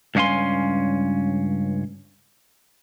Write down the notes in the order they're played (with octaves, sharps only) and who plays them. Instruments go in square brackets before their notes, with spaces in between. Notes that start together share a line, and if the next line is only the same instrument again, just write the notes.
[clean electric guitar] C#2 G2 C#4 F5 G#5 C6